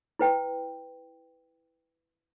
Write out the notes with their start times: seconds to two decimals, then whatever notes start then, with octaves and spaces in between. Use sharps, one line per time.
0.19 E4 B4 G5